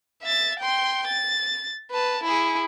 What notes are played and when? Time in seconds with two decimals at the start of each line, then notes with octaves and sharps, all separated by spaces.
0.23 E5 A6
0.60 G5 C6
1.07 A6
1.92 B4 A5
2.24 E4 G#4